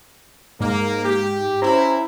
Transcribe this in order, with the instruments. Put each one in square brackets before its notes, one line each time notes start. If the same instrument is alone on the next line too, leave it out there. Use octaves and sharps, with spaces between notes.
[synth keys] G#2 [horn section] A#3
[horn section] G4
[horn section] C#4 E4 [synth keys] C5 A#5